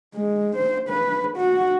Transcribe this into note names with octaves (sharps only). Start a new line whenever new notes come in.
G#3
C5
B4
F#4